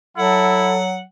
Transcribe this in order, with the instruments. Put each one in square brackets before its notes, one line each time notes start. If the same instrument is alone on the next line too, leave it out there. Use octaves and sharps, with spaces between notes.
[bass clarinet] F#3 [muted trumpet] E4 [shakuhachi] A4 [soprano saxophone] F#5